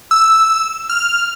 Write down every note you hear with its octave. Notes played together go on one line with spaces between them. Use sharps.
E6
F6